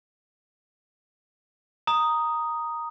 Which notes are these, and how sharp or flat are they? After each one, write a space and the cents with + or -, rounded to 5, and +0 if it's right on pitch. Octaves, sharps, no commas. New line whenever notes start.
A#5 +0 D#6 +0